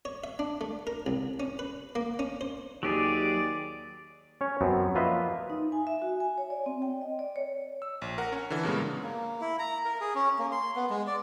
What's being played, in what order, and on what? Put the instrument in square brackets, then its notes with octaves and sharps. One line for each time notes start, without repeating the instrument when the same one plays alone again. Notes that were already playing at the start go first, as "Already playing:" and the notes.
[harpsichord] C#5
E5
D4
A3
A#4
C2
C#4
B4
A#3
C#4
C5
[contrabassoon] D#2 [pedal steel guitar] F#3 G4 G#4 [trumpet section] D5
[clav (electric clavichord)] C#4 C#5
F#2 B3 C4
F3 A#3 F4 B4 D#5 E5
[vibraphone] D#4
G#5
E5
F#4
G#5
C#5
D5
C4
G5
D#5
D5
C#5
[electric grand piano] E6
A#1
A#4 F#5
C#4
D3 E3
G2 A#2 C#3 G#3 A#3 B3
[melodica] A#3
E4
A#5
A#4
G#4
C#4
A#3
C6
B3
G#3
D5